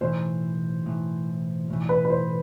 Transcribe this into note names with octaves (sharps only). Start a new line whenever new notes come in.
B1 A2 E3 C5
B1 A2 E3
B1 A2 E3
B4
B4
C5